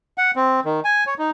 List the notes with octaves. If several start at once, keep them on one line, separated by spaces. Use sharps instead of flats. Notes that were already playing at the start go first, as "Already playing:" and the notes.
F#5
C4
D#3
G#5
C#5
D#4